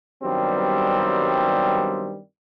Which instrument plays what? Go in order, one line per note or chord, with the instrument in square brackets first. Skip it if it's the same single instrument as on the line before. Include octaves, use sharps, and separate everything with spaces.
[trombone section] G2 D#3 F#3 G3 B3 C4